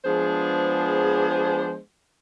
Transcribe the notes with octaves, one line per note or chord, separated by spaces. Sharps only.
F3 G#3 B3 D4 G#4 C5